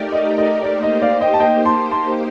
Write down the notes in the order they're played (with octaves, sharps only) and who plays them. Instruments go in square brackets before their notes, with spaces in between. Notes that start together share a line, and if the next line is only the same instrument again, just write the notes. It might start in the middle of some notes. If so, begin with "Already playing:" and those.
Already playing: [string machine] A3 D#4 G4 A#4 D5
[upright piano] D#5
D#5
[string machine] A#3 D#4 G4 C5 [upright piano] D5
[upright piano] D#5
D5 F5
D#5 G5
A5
D#5 G5
A5 C6
A5 C6